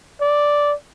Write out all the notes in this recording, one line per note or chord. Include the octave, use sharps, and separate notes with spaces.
D5